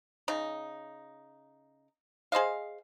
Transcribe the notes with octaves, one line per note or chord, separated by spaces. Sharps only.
C#3 D#4
G#4 C5 D#5 F5